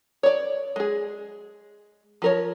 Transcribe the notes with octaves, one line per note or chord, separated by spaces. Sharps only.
C#5 D5
G#3 G#4
F3 A#4 C#5